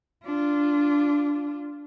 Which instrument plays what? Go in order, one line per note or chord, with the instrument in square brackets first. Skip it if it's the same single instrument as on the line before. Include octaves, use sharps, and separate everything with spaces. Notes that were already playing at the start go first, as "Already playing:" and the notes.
[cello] D4 F4